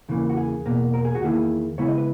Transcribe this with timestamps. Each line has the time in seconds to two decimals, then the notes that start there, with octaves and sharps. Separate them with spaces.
0.09 E2 C#3 E3 A#3
0.29 F#4
0.37 G#4
0.66 E2 B2 A#3
0.94 A#4
1.05 G#4
1.15 F#4
1.21 E2 D#3 A#3 E4 G#4
1.78 C#3 G#3 B3 E4 C#5
1.88 D#5
1.98 B4